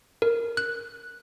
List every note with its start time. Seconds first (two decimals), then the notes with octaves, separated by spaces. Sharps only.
0.22 A#4
0.57 F#6